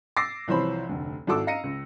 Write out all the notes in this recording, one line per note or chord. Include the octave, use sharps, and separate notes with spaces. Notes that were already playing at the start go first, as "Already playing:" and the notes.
D6 E6 A6 A#6 C7
C2 E3 F3 C5 C#5 B5
F1 D2
G#1 E4 F#4 A4 D6 E6
D#5 F5 A#5 A#6 C#7 D#7
C#2